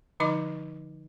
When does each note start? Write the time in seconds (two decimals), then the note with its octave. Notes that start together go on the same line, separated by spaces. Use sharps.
0.20 D3 F3 D#4 D#5 D6